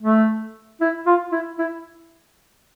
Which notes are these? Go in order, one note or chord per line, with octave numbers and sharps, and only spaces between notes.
A3
E4
F4
E4
E4